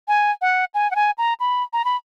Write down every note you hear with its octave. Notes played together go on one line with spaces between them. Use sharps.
G#5
F#5
G#5
F#5
G#5
A#5
B5
A#5
B5